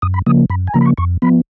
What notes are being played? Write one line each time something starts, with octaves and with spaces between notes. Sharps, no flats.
F#2 D#6
B5
C#3 F3 A#3 D#6
F#2 B5
G#5
C#3 F3 A#3 A#5
B5
C#6
F2 C#6
F3 B3 B5